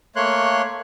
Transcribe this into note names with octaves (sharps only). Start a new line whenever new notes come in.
A3 A#3 C#5 C6 F#6